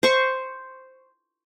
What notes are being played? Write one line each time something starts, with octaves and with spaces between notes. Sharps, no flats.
C5 C#6